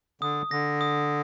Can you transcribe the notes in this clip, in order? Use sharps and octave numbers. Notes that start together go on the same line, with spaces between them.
D3 D#6
D3 A#6
D#6